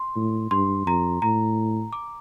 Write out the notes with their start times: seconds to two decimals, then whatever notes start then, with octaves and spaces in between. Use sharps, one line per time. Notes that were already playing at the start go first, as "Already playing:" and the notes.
Already playing: C6
0.16 A2
0.51 G2 C6
0.86 F2 A#5
1.22 A2 A#5
1.93 D6